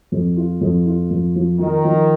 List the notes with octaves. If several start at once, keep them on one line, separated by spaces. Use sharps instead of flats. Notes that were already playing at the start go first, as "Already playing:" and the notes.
F2
F4
F2
F4
F2
F3
D#3 F3
F3